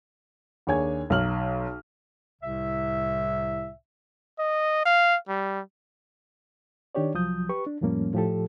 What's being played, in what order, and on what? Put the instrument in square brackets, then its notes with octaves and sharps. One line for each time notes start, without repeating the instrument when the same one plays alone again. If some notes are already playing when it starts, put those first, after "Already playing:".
[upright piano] D#2 D4 G#4 C#5 G#5 G#6
B1 F#3 F6 F#7
[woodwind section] C2 A2 C3 E5
[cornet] D#5
F5
G3
[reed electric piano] D#3 D4 G4 C#5 D5
C2 F3 F#3 D#6 G6
G4 B4 C#6
D4
F2 A2 F3 G3 A#3 C#4
A2 F3 G4 A4